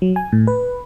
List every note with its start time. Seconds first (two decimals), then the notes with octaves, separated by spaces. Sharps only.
0.02 F#3
0.16 G#5
0.32 A2
0.47 B4